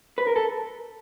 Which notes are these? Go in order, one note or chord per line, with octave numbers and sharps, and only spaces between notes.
B4
A#4
A4